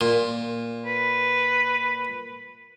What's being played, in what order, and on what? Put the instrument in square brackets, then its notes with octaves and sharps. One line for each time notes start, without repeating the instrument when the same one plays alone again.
[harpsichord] A#2
[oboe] B4